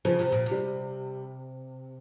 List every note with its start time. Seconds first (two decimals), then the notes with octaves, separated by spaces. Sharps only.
0.05 C#3 F3
0.19 C3
0.32 A#2
0.46 C3
0.51 G3